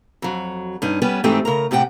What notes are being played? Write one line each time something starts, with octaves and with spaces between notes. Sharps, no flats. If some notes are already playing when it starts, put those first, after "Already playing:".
F2 F#3
G2 C#4 D#4
G3 B3 C#4 B4
G#2 E3 A3 C4 D#4 G4
C#3 A#4 A#5
A2 C3 G4 F#5 G5